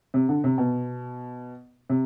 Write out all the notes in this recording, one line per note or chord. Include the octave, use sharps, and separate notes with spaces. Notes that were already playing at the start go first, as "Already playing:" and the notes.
C3
D3
C3
B2
C3